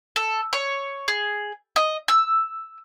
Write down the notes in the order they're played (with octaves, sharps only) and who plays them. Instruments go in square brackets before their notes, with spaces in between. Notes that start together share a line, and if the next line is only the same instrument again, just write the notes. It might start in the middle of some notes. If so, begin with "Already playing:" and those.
[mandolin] A4
C#5
G#4
D#5
E6